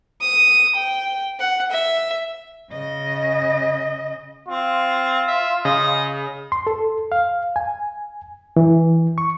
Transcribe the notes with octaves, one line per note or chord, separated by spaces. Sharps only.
D#6
G5
F#5
E5
C#3 D#5
C4 F4
E5
C#3 D#5
C6
A4
F5
G#5
E3
C#6